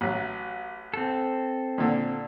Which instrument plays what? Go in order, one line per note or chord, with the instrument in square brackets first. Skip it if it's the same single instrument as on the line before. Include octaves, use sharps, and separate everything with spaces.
[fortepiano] A1 F#3
[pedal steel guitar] C4 A4
[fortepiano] A#2 D3